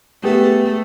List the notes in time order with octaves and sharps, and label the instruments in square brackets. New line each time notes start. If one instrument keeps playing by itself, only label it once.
[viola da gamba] A3 [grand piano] B3 G4 G#4